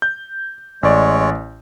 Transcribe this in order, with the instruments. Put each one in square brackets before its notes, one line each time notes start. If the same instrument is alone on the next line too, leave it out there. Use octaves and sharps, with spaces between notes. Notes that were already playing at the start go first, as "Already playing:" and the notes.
[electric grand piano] G6
[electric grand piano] A1 D5 [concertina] G#3 C#5